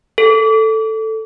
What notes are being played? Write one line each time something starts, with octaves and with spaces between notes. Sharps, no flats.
A4